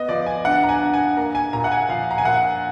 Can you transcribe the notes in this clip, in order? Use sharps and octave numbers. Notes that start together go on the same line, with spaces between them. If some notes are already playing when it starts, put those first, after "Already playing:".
Already playing: B3 D#5
F3 D5
G#5
D4 F#5
A#5
G#5
D4
G#5
A#3 A#5
G#5
A#2 A#5
F#5
G#5
F3 F5
A#5
G#5
A#2 F#5